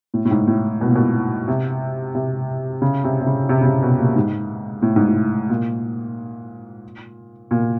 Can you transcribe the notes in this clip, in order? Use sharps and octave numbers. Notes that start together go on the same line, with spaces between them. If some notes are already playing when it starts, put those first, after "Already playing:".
A2
A2
G#2
A2
B2
A#2
B2
C3
C3
C#3
C3
C3
C#3
C3
C#3
C3
B2
A#2
G#2
A2
G#2
A2
A#2
A#2